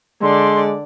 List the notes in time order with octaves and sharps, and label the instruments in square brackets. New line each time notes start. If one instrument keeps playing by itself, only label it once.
[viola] D3 D5 [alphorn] G#3 [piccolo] C6